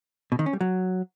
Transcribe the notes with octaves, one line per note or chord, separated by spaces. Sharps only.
B2
D#3
C#4
G3
F#3